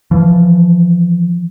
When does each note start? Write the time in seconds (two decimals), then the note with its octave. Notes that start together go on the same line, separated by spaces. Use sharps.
0.11 E3 F3